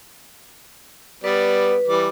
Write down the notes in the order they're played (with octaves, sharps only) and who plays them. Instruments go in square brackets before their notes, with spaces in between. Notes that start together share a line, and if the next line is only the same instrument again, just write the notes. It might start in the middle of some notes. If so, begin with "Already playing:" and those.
[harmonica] G3 B3 D5 [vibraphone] B4
[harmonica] E3 G3 D6